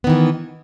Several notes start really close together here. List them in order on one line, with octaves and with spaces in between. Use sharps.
B3 D#3 E3